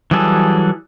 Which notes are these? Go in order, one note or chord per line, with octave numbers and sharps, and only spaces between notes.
E3 F#3 G3 G#4 A4